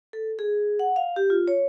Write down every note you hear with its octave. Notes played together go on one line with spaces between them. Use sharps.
A4
G#4
F#5
F5
G4
F4
C#5